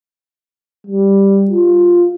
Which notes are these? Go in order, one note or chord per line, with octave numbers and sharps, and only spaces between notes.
G3
F4